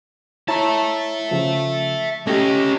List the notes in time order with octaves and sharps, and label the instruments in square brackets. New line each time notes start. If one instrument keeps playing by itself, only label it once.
[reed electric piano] E4 C#5 A#5 [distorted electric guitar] E5 A5
[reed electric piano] C#3 F3
[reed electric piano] A3 G4 [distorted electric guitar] C#4 D#5